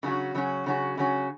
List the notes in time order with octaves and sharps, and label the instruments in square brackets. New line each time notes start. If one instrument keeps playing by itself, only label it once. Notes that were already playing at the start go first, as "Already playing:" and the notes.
[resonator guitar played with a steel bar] C#3 F#3 C#4 F#4
C#3 F#3 C#4 F#4
C#3 F#3 C#4 F#4
C#3 F#3 C#4 F#4